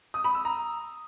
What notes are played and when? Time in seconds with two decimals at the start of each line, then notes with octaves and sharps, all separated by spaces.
0.14 D#6
0.24 B5
0.35 E6
0.45 A#5